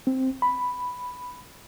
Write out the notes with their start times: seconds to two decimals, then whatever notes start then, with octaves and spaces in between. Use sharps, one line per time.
0.07 C4
0.42 B5